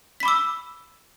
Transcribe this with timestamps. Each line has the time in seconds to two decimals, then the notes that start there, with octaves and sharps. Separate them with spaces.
0.20 B6
0.23 B5
0.25 D6
0.28 E6